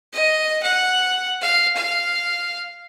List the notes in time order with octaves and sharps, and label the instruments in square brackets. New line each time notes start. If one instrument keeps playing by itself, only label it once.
[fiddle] D#5
F#5
F5
F5